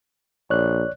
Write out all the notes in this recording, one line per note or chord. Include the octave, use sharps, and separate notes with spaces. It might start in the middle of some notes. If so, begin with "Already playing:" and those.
A#1 C#5 D5 F#6